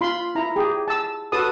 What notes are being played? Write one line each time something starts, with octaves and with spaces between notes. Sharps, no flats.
F4 B5 C6
E4 A#5
G4 G#4
A5 E6
F#4 A4 B4 A5 D#6